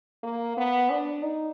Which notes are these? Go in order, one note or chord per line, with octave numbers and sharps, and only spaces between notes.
A#3
B3
D4
D#4